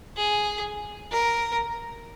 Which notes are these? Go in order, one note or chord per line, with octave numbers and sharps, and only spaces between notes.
G#4
A#4